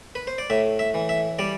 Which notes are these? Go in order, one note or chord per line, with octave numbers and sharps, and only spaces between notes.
B4
C5
D5
A2 E5
E5
E3
E5
G3 D5